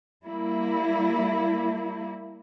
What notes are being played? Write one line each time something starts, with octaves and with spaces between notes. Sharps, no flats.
G3 A#3 E4